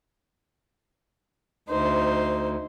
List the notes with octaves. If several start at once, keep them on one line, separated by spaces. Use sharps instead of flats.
D2 D#4 C5